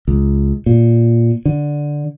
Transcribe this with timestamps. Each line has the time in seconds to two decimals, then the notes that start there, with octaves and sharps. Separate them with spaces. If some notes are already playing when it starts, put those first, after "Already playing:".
0.08 C#2
0.66 A#2
1.45 D3